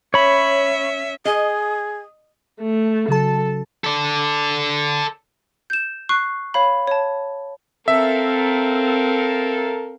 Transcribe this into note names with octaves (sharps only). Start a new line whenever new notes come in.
C#4 C#5 E5 B5
G#4 D#5
A3
C#3 F#3 A4 A5
A4 D5
G6 E7
C#6 F#6 C7
C#5 F5 B5
C#5 A5
C4 A4 A#4 E5 F5